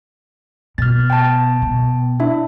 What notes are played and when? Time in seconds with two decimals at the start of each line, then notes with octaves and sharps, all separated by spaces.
0.78 B2 F6 A6
1.10 G5 A5
1.62 B2
2.20 D4 E4 E5